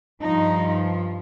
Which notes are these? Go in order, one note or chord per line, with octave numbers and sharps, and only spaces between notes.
G2 F3 D#4